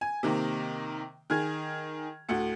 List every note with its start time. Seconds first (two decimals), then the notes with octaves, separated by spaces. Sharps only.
0.01 G#5
0.23 C3 D#3 A#3
1.30 D#3 G#4 F6 G#6
2.29 D2 A2 F#4 C#7